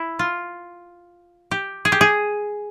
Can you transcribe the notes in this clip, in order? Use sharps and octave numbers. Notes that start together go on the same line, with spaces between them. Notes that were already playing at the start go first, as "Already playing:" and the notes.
Already playing: E4
F4
G4
G#4
G4
G#4